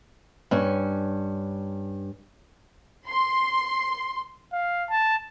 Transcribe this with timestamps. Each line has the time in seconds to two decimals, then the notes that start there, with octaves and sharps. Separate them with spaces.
0.51 G2 C#4
3.07 C6
4.53 F5
4.90 A5